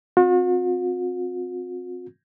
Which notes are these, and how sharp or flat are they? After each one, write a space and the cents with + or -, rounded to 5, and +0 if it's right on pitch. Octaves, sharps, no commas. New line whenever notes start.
C4 +0 F#4 -45